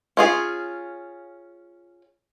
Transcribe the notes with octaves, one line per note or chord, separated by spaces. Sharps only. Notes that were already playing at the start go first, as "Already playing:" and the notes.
C#4 F4 G#4